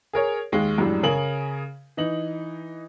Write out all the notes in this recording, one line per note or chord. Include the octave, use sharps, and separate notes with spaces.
G#4 A#4 C#5
D#2 G#3
F#2 A2 G3 G#3 D4
C#3 G#4 A#4 G#5 F#7
E3 D#4 F#7